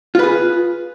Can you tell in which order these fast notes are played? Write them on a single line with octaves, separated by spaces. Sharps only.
F4 B4 G#4